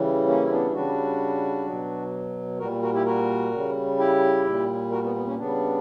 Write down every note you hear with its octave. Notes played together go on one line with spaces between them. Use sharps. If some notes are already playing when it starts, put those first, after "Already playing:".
Already playing: C#3 E3 G3
A#3 C#4
E4
B3 D4
C#3 G3 D4 F#4
B2 F#3
A#2 G3 F#4 A#4
F#4 A#4
E4 G4
F#4 A#4
C#3 G3
E4 G4
A#2 G3
F#4 A#4
B3
B3
A#3 C#4
C#3 G3 B3 D4